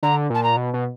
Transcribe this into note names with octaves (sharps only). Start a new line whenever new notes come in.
D3 A#5
A#2 A5
A#5
B2
B2